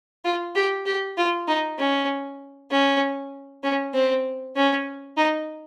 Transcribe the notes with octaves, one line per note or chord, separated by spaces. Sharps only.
F4
G4
G4
F4
D#4
C#4
C#4
C#4
C4
C#4
D#4